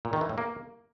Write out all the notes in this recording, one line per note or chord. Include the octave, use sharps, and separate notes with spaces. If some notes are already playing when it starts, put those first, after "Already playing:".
A#2
D#3
E3
A2
A#3